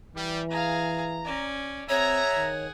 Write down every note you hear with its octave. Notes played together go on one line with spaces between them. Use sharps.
E3 G3
G#4 F5 A#5
C#4 D5
C4 G#4 C#5 E5 F#5 A#5
D#3